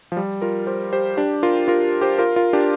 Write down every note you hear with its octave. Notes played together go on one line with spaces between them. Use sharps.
F3
G3
F4 A#4
G4 C5
G4 C5
D4 G4
F4 A#4
F4 A#4
G4 C5
F4 A#4
F4 A#4
D4 G4